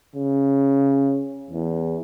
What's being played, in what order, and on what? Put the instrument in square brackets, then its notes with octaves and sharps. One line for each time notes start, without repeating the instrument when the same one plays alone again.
[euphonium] C#3
E2